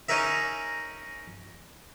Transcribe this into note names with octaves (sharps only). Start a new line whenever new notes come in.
C#4 D#4 G#4 A#4 E5